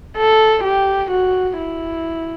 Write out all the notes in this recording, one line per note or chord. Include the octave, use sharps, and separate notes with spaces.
A4
G4
F#4
E4